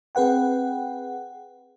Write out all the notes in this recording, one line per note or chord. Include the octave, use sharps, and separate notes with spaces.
C4 G#4 B4 F#5 G5